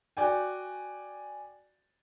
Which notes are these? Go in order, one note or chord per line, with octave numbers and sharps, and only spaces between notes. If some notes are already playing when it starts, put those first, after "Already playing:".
F#4 D5 G5 G#5